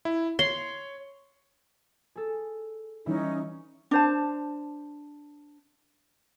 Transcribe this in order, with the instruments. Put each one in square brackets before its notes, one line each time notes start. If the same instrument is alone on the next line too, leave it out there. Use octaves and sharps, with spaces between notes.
[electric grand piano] E4
[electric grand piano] C#5 [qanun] C6
[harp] G#4 A4
[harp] E3 G3 E4 [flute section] C#4 D#4
[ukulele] D4 C5 A5